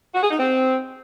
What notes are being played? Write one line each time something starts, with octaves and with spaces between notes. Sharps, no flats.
F#4
G#4
D#4
C4